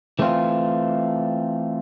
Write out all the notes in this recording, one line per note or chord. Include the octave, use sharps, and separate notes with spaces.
E3 A3 C4 F4